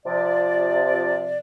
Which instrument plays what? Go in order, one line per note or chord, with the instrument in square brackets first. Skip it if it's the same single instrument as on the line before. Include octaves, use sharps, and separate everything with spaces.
[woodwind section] C3 F3 D5